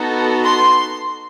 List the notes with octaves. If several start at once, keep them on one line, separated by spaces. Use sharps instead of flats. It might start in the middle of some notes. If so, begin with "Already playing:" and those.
Already playing: B3 D#4 F#4 A4
C6